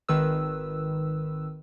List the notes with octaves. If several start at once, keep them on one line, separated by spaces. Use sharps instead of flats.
G#1 D#3 B4 E6